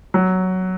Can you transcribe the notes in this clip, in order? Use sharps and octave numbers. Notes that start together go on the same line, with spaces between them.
F#3